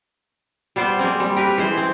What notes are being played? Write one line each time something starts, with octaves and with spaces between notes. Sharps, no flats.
G3 B3 C5 D5
G#3 A#3 C4
G3
G4 A#4 B4
E3 G#3 C5
C4